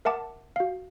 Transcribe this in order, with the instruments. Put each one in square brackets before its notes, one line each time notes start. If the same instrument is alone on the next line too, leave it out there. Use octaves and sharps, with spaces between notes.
[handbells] A#4 E5 F#5 A5 D6
F#4 F5